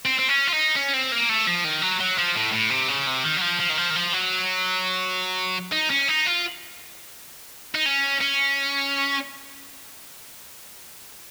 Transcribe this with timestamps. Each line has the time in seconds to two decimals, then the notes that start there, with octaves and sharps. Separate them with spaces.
0.05 C4
0.19 C4
0.29 C#4
0.47 F4
0.52 D#4
0.76 C#4
0.93 C4
1.12 A#3
1.29 A3
1.47 F3
1.64 D#3
1.82 F#3
2.00 F#3
2.18 F3
2.36 A2
2.53 A2
2.70 C3
2.89 C#3
3.07 C3
3.24 D#3
3.37 F#3
3.41 F3
3.60 F3
3.70 D#3
3.77 F3
3.90 D#3
3.95 F3
4.13 F#3
5.72 D#4
5.90 C#4
6.08 D#4
6.26 F4
7.75 D#4
7.86 C#4
8.21 C#4